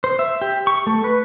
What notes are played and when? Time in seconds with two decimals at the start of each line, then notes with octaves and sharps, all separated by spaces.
0.04 C5
0.19 E5
0.41 G4
0.67 C#6
0.87 A3
1.04 B4